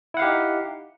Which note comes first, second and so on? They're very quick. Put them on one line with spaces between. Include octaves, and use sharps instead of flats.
E4 F#5 F5 G4 D#4